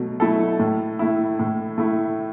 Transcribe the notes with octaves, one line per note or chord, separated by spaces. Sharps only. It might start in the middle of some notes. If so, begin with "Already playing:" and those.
Already playing: B2 F#3 A3
F#3 A3 E4 A4
A2
A3 E4
A2
A3 E4